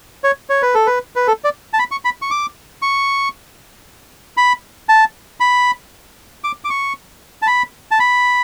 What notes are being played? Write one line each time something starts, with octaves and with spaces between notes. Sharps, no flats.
C#5
C#5
B4
A4
B4
B4
A4
D5
A5
B5
C#6
B5
C#6
D6
C#6
B5
A5
B5
D6
D6
C#6
A5
B5
A5
B5